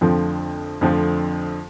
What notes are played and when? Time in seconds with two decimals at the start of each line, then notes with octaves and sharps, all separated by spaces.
0.01 F2 D3 F3 A3 C4
0.81 F2 D3 F3 A3 C4